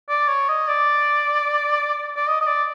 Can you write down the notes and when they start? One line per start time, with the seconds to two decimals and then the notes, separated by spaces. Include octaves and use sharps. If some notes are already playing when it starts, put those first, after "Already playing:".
0.09 D5
0.28 C#5
0.49 D#5
0.68 D5
2.16 D5
2.27 D#5
2.41 D#5
2.47 D5